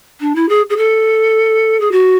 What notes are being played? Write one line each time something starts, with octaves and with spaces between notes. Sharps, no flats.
D4
E4
G#4
G#4
A4
G#4
F#4